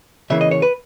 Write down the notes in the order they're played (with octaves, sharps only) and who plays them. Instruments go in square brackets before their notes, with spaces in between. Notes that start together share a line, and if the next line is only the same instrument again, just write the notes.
[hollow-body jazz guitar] C#3 E3 A#3 E5
D#5
C#5
B4